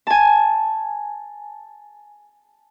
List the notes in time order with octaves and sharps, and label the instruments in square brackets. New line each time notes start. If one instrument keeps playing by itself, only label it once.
[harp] G#5 A5